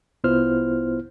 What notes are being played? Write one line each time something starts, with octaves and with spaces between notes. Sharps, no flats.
C2 B3 E4 F4 C5 F6